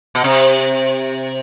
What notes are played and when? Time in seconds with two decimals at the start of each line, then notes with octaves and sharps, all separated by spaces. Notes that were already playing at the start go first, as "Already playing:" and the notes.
0.15 B2
0.24 C3